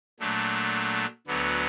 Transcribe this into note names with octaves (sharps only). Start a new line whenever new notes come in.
A#2 F#3 A3 D4
D2 D3 F#3 B3